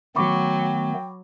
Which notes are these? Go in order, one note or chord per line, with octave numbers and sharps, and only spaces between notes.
D#3 F#3 A3 B3 G5 B5 C#6 D6